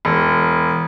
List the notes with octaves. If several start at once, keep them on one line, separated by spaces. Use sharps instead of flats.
E1